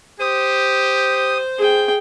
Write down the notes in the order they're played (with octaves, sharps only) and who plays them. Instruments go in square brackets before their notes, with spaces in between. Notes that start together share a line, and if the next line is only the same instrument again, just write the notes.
[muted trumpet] G4 [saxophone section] C5 [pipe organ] D#6
[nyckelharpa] G#4 G5